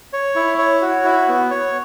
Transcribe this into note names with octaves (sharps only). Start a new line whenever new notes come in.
C#5
E4
C#5
F#4
E4
B3
C#5